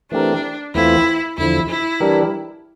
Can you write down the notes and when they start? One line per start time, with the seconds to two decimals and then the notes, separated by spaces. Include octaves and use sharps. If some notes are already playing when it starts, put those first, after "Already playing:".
0.12 E3 A3 C4 D4 G4 A#4
0.75 E2 E3 A3 C4 E4 F4
1.38 E2 D3 F3 E4
1.69 E4
2.00 E3 G3 D4 G4 A#4